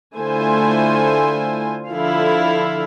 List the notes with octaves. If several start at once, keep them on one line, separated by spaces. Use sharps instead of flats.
D3 A3 E4 F4 C5 G#5
D3 F3 E4 A4 F5